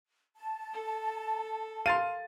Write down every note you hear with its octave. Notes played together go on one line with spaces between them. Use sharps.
A5
A4
F5 C6 A6 D#7